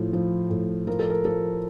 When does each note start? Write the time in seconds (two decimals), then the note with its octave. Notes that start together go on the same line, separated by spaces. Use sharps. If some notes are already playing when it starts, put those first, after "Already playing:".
Already playing: A2 F3 F4
0.13 F3
0.50 A2
0.87 F3 A#4
0.99 A4
1.10 A#4
1.25 F3 A4